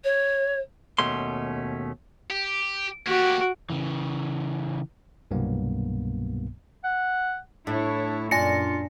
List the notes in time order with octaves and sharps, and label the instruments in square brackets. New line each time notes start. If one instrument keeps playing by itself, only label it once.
[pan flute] C#5
[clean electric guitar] D#2 B2 A3 C#4 C6
[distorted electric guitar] G4
[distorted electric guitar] A#3 G4 [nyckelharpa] F#4
[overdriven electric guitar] C#3 E3
[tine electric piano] C2 G2 B2 F#3 A#3 B3
[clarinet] F#5
[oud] A2 [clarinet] D4 [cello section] E4 C#5
[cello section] F#2 A#2 [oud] D4 [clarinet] F4 [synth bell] G#5 A#6 C#7